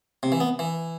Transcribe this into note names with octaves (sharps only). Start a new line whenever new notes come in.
C3
E3
B3
E3